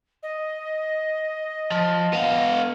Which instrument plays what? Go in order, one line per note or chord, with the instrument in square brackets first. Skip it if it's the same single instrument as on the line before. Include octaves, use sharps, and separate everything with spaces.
[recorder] D#5
[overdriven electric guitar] F3
B3 F5